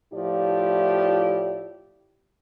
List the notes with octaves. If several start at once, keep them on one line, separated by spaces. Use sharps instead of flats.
A2 F3 E4 F4 G4 D5